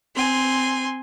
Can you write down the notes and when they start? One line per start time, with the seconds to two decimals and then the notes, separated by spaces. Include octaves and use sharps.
0.15 C4 G#5 C6